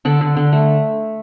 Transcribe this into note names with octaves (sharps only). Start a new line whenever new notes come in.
D3 A4 D5
D3
D3
A3